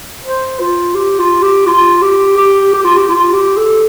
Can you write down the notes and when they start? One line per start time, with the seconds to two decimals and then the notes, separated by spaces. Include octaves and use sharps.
0.24 C5
0.60 F4
0.95 G4
1.19 F4
1.42 G4
1.67 F4
2.02 G4
2.37 G4
2.73 G4
2.84 F4
2.96 G4
3.09 F4
3.33 G4
3.57 A4